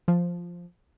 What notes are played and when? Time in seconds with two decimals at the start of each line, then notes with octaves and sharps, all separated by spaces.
0.08 F3